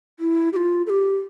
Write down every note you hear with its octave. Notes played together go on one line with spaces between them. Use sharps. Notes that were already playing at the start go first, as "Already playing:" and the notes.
E4
G4
F4
A4
G4